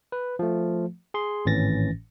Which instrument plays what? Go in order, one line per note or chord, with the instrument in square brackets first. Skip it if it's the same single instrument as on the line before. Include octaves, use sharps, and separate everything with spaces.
[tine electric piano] B4
F3 A3
G#4 C6
G#1 A2 E3 C#4 A6 A#6